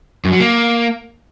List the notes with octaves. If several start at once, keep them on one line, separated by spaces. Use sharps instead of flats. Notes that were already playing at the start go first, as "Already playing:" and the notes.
F#2
F#3
A#3